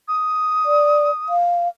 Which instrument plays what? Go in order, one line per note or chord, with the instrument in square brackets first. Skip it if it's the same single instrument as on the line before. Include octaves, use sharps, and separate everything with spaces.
[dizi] D#6
[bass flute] D5
F5